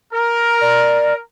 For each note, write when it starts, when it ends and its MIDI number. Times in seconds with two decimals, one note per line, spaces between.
0.13 1.19 70
0.61 1.14 74